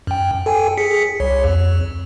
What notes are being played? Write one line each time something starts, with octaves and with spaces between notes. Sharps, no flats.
F#2 G5
A4 G5 G#5
G#4 B6 C#7
C2 C#5
F2